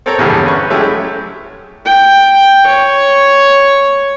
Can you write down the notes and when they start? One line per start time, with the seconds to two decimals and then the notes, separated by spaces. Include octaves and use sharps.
0.06 C4 A4 A#4 C#5 A#5
0.18 A#1 E2 G2 D3 G3
0.44 C#4 B4 C#6
0.70 F#3 G#3 A3 C#4 E4 G4
1.85 G5
2.67 C#5